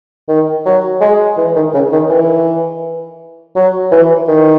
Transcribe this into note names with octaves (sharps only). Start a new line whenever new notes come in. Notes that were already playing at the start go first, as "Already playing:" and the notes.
D#3
F#3
G#3
E3
D#3
C#3
D#3
E3
F#3
E3
D#3